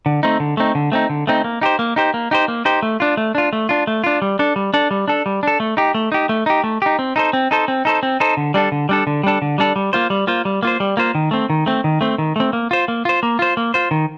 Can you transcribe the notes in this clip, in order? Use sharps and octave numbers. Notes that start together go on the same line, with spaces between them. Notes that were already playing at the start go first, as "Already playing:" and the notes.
D3
A3 C4 D#4
D3
A3 C4 D#4
D3
A3 C4 D#4
D3
A3 C4 D#4
A#3
D#4 G4 C5
A#3
D#4 G4 C5
A#3
D#4 G4 C5
A#3
D#4 G4 C5
A3
D4 F4
A3
D4 F4
A3
D4 F4
A3
D4 F4
G3
D4 A4
G3
D4 A4
G3
D4 A4
G3
D4 A4
A3
D#4 G4
A3
D#4 G4
A3
D#4 G4
A3
D#4 G4
C4
D#4 A4 C5
C4
D#4 A4 C5
C4
D#4 A4 C5
C4
D#4 A4 C5
D3
G3 D4 A4
D3
G3 D4 A4
D3
G3 D4 A4
D3
G3 D4 A4
G3
A#3 F4 C5
G3
A#3 F4 C5
G3
A#3 F4 C5
G3
A#3 F4 C5
D#3
A3 C4
D#3
A3 C4
D#3
A3 C4
D#3
A3 C4
A#3
F4 C5
A#3
F4 C5
A#3
F4 C5
A#3
F4 C5
D#3